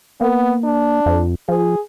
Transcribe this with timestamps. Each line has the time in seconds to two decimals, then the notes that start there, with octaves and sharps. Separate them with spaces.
0.21 A#3 B3
0.64 D4
1.06 F2
1.49 F3 G#4